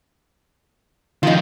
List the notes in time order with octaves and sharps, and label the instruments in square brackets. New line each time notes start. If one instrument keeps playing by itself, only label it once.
[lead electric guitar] D#3 F3 [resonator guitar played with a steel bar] D#4 F4